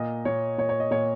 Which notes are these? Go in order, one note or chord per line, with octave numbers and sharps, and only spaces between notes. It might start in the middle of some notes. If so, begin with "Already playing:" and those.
Already playing: A#2 D#5
A#2 C#5
A#2 C#5
C#5
D#5
A#2 C#5